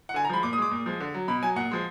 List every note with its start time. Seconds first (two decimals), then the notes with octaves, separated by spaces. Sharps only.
0.09 F#5
0.14 D3 G#5
0.25 A#5
0.30 F3 G#3 B5
0.43 A#2 D6
0.53 D#6
0.58 G#3 D6
0.71 A#2
0.86 F3 G#3
1.00 D3
1.14 F#3
1.28 B2 B5
1.42 F#3 G#5
1.56 A#2 F#5
1.71 F3 G#3